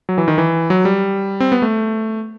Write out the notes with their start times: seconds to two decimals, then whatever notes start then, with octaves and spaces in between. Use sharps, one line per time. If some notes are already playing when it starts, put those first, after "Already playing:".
0.09 F#3
0.18 E3
0.28 D#3
0.38 E3
0.70 F#3
0.85 G3
1.40 C4
1.52 B3
1.62 A3